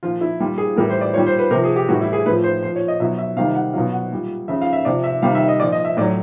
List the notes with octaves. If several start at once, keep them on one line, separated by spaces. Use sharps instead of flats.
A#2 F3 F4
E4
A#2 G3 F4
G#4
A2 E3 G3 A#4
C5
D5
A#2 G3 C#5
C5
B4
C3 F3 A#4
G#4
G4
A2 E3 G3 F#4
E4
G#4
A2 F3 B4
C5
A#2 F3 C5
C#5
D#5
B2 F#3 E5
E5
C3 D#3 G3 F5
F#5
B2 F#3 F5
F#5
A#2 G3
C#3 F3 E5
F5
E5
C3 F3 D5
E5
C3 D#3 G3 F5
E5
D#5
A#2 F3 D5
D#5
E5
A2 F#3 D5